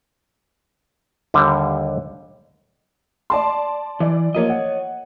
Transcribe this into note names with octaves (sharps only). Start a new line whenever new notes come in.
D#2 D3 G3
D5 A5 C6
E3 D5
F3 A#3 C#5 D#5
F#5